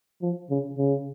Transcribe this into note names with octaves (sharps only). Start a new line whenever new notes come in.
F3
C#3
C#3